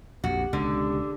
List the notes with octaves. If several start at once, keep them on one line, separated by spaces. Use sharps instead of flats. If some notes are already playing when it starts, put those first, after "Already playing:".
A#1 F2 F#4 G4
C#2 B2 D3